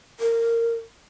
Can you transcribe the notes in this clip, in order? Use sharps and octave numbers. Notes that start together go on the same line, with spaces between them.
A#4